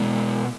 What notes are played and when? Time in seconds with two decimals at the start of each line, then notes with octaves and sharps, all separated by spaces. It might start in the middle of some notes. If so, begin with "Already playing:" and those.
Already playing: B2 G#3 B3 C#5